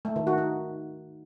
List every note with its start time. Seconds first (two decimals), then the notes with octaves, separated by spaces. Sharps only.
0.05 A3
0.16 D#3
0.27 F#4
0.38 D#4